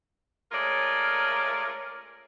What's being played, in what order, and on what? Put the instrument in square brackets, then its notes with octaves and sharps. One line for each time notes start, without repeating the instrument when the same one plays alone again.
[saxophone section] G#3 A3 C#4 F4 A#4 D5